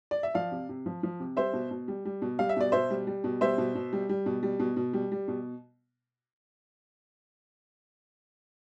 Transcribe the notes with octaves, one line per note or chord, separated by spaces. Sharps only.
D5
E5
F3 D5 F5
C3
C3
F3
F3
C3
G3 C5 E5
B2
B2
G3
G3
B2
G3 F5
E5
B2 D5
B2 C5 E5
G3
G3
B2
G3 C5 E5
B2
B2
G3
G3
B2
G3
B2
B2
G3
G3
B2